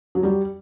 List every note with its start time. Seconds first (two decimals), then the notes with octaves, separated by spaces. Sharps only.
0.15 F#3
0.23 G3